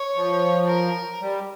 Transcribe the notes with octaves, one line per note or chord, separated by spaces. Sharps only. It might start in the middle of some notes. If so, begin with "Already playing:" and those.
Already playing: C#5
F3
A#4
G3